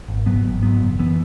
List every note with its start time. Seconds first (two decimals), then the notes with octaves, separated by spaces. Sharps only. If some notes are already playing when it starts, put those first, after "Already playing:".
0.08 G#1
0.26 G#2 F#3 B3
0.45 G#1
0.63 G#2 F#3 B3
0.80 F#1
0.99 F#2 E3 B3